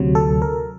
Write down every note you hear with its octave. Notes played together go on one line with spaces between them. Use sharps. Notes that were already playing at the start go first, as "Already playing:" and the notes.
Already playing: D2 C3 F#3
A4
A#4